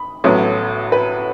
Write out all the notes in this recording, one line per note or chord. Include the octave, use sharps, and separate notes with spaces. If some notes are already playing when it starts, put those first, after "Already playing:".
Already playing: B5
A1 A2 F#3 B3
B4